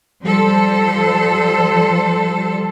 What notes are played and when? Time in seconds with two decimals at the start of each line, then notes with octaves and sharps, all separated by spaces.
0.23 F3 G3 A4 C5